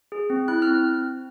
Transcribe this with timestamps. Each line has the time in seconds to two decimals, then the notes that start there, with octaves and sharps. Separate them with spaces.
0.12 G#4
0.30 C4
0.48 E4 F#6
0.62 F6
0.67 C4